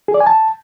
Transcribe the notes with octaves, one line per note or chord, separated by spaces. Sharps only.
G#4
D5
G#5
A5